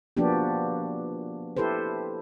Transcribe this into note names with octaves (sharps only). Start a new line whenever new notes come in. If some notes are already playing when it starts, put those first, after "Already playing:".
F3 A#3 B3 D4 F#4 G4
E4 G4 A4 B4 C5